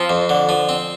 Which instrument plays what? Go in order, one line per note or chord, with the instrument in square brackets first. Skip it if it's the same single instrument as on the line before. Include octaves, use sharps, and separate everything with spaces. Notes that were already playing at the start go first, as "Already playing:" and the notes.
Already playing: [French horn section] F3 [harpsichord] C4
[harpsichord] F2
D3
F3
C4